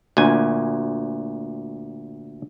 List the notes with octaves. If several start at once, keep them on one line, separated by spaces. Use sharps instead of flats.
D2 A#2 G#5